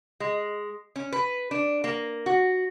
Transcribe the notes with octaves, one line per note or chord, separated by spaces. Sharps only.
G#3
C#4
B4
D4
A#3
F#4